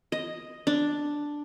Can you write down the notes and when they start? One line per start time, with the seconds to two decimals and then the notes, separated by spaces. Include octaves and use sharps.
0.12 D#5
0.67 D4